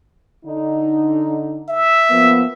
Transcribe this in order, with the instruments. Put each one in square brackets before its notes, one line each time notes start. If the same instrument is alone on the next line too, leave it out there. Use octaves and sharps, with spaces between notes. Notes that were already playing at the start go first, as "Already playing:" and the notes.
[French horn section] D3 D#4
[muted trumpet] E5
[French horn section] F3 A#3 B3